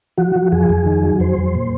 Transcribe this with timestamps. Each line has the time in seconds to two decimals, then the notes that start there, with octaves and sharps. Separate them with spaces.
0.18 F3 F#4
0.36 F3
0.52 F2 G#4
0.70 F2
0.86 D#3
1.04 F#3
1.20 F2 C5
1.38 F2
1.55 A#2